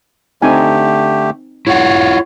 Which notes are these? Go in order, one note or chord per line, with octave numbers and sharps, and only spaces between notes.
D3 A3 C4 D#4 G4 G#5
E4 F4 C#5 F#5